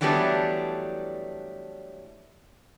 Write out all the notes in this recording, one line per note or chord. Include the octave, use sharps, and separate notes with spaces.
E3 F#3 G3 A3 B3 D4